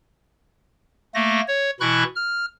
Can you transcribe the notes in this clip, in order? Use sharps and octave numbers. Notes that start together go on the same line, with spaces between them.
A3 A#3 A#6
C#5
B2 E3 E4 B5 C#6 F#6
F6